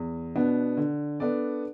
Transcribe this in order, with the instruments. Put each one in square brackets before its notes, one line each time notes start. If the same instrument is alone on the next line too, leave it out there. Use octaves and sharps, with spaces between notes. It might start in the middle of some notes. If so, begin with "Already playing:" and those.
Already playing: [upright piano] E2
B2 B3 D4
D3
B3 D4 A4 D5